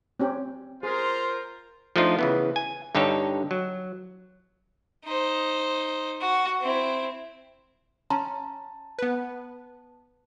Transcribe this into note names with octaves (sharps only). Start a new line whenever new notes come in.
C4 C#4 G4
F4 G#4 A#4 C5
F3 A3 D4 D#4 F4
C#3 E3 B3
G#5
G2 D3 D#4 G4 A4 C#5
F#3
D#4 C5
F#4
C4 E4
C#4 A5 A#5 C6
B3 B4